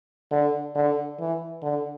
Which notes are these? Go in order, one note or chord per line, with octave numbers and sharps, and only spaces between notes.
D3
D3
E3
D3